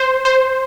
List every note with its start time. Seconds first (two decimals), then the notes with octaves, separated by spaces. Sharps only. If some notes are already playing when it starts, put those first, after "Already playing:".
Already playing: C5
0.25 C5